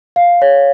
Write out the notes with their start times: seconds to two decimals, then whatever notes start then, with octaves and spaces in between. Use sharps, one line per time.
0.16 F5
0.42 C#5